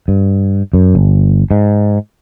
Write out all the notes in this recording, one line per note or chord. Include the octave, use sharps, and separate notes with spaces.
G2
F#2
G1
G#2